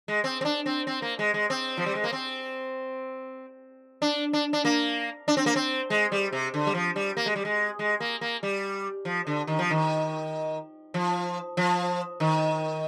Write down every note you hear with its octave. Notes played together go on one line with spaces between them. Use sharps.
G#3
C4
C4
D4
C4
C4
A#3
G#3
G#3
C4
F3
G3
G#3
A#3
C4
D4
D4
D4
A#3
D4
C4
A#3
C4
G#3
G3
C3
D3
G3
F3
G3
A#3
G#3
G3
G#3
G#3
A#3
A#3
G3
F3
D3
D#3
F3
D#3
F3
F3
D#3